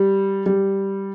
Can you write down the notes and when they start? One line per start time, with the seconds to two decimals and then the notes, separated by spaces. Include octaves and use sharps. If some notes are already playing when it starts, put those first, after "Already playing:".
Already playing: G3
0.46 G3